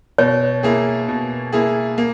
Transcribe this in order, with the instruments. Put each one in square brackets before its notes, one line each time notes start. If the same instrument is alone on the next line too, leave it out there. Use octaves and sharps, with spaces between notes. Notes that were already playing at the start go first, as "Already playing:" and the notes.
[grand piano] B2 [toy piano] C#5
[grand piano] A#3 E4 G#4
B2
A#3 E4 G#4
A#3